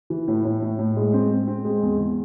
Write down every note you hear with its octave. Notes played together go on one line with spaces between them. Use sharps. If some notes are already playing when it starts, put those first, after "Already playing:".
E3
A2
A2
A2
A2
G#3
C4
C4
C4
G#3
E2
E2